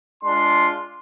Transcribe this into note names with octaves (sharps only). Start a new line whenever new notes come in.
G#3 D4 F4 C6